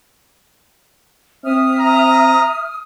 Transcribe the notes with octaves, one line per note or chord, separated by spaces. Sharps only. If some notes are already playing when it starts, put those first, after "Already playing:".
C4 E5 D#6 F6
A#5